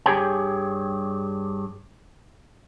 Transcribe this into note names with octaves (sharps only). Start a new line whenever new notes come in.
G2 G4 G#4 C#5 G5 G#5